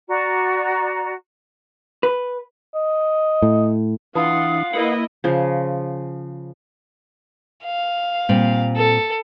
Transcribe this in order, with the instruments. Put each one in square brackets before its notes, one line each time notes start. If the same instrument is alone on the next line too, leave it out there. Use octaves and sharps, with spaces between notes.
[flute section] F#4 D5 A#5
[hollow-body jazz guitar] B4
[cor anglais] D#5
[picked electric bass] A2
[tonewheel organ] E3 D4 E4 [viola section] F4 F#5 [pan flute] F5 [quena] D#6
[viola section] A#3 E4 D#5 [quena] B4 [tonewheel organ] F#5 B5 D#6
[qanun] C#3 F3
[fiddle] F5
[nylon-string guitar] A#2 G3 C4
[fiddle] A4